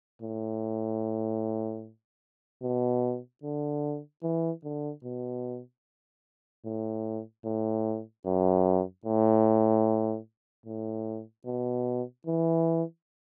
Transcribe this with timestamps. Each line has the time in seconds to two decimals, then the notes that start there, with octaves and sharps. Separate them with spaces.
0.22 A2
2.63 B2
3.43 D3
4.23 E3
4.64 D3
5.04 B2
6.65 A2
7.45 A2
8.26 F#2
9.05 A2
10.66 A2
11.46 B2
12.27 E3